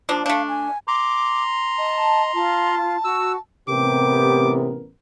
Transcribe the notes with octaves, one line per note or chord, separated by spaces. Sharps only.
F3 A#3 D4
A3 D4 F5
G#5
A#5 C6 D6
D#5 A5
F4 A5
F#4 E6
A1 C3 B3 G4 A#4 D6